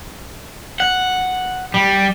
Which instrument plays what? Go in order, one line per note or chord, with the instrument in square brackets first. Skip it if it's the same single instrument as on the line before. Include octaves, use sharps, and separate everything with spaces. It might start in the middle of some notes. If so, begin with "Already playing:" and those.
[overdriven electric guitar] F#5
G3